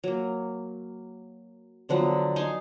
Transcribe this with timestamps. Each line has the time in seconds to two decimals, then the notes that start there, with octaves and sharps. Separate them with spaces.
0.04 F#3 A#3
1.89 D3 F3 F#3 B3
2.36 D#4 G#5 A5 C6